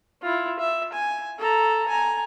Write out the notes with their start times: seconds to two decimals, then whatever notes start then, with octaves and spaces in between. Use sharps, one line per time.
0.22 E4 F4
0.59 E5
0.93 G#5
1.39 A4 A#5
1.88 G#5 A#5